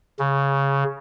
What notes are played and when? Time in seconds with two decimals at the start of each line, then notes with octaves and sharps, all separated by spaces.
0.19 C#3